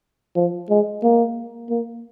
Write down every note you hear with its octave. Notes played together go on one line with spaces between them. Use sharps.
F3
G#3
A#3
A#3